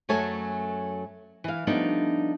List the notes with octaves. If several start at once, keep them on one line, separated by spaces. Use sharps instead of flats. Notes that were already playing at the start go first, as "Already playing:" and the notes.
F#2 F#3 A3 A4 C#5 G#5
E3 F5
F3 G3 A3 B3 D4 D#4